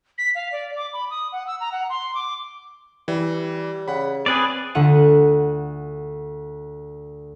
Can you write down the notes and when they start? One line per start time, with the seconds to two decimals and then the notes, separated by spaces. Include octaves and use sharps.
0.18 B6
0.35 F5
0.52 D5
0.76 D6
0.93 B5
1.10 D#6
1.32 F#5
1.47 E6
1.60 A#5
1.72 F#5
1.90 C6
2.15 D6
3.08 E3 G3
3.88 C#3 F#5 B5
4.26 C4 G#4 B4 D5
4.75 D2 D3 F4 F#5 D#7